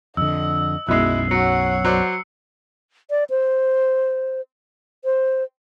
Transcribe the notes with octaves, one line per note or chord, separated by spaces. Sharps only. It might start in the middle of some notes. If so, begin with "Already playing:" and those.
F2 D3 D#5 E6
B1 F#2 B2 G#3 E4 F#6 C7
F#3 C#5 F#5 C#7
F#3 C5 D5
D5
C5
C5